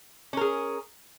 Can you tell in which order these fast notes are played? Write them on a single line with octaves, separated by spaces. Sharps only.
C#4 A#4 G#4